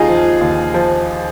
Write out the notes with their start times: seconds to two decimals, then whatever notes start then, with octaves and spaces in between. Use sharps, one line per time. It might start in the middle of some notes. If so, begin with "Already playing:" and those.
Already playing: D#2 D#4 F4 G#4
0.08 F3
0.41 D#2
0.74 F3